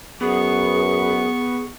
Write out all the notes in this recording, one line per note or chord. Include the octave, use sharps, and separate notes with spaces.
F#2 B3 G#4 C#6